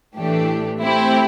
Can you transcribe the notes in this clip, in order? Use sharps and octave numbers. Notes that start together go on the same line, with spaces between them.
A2 E3 A3 D4 G4
A3 C4 E4 G4